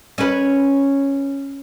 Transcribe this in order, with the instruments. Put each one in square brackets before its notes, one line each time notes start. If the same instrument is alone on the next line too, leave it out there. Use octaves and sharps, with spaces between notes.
[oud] C#4 B4